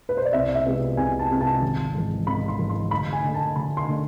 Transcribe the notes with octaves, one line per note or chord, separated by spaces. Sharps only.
B4
C5
D5
C2 E5
E5
C3 G#3 B3 F4
C2 G#5
A5
C3 G#3 B3 F4
A5
G#1
G#2 E3
G#1 B5
C6
G#2 E3
C6
D2 B5
G#5
D3 A3
A5
D2 B5
C6
D3 A3